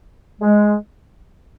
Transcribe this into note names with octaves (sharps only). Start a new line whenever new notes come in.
G#3